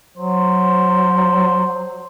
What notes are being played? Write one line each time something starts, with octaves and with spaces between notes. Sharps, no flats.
F#3 C5